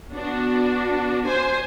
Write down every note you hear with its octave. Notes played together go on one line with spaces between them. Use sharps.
B3 D4 F#4
C5 G#5